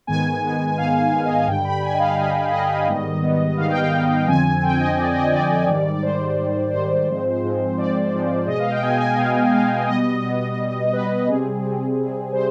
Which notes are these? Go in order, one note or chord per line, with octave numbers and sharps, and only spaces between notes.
G#2 D#3 G#3 B3 G#5
G#2 D#3 G#3 B3
G#2 D#3 G#3 B3 F5
G#2 D#3 G#3 B3
D#5
F5
G2 D3 G3 G5
B5
G2 D3 G3 G#5
D#5
F5
G2 D3 G3 D#5
G2 D3 G3 D#5
G#2 D#3 G3 B3
G#2 D#3 G3 B3
G#2 D#3 G3 B3 F5
G5
F5
G#2 D#3 G3 B3
F2 D3 F3 C4 G#5
F2 D3 F3 C4 G5
D#5
F2 D3 F3 C4 D5
D#5
F2 D3 F3 C4 D5
G#2 D#3 G3
D5
G#2 D#3 G3 C5
G#2 D#3 G3
G#2 D#3 G3 C5
G#2 F3 G#3 C4
G#2 F3 G#3 C4
G#2 F3 G#3 C4 D5
G#2 F3 G#3 C4
B2 G#3 B3 D#5
F5
G5
B2 G#3 B3 G#5
G#5
B2 G#3 B3 F5
B2 G#3 B3 F5
B2 G3 B3 D#5
B2 G3 B3
B2 G3 B3
B2 G3 B3 B4
C3 G3 C4 G#4
C3 G3 C4
C3 G3 C4
C3 G3 C4 C5